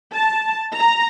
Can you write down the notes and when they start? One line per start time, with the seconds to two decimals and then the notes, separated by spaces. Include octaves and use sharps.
0.14 A5
0.75 A#5